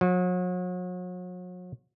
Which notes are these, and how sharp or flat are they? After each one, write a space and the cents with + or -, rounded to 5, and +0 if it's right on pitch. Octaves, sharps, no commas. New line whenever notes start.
F#3 -40